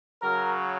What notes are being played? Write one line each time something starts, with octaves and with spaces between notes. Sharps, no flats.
C#3 F#3 A#4